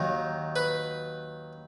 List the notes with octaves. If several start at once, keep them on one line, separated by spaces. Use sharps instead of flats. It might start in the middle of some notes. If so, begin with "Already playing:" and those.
Already playing: D#2 D#3 F#3
B4